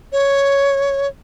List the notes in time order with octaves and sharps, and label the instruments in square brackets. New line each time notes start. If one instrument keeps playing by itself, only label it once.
[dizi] C#5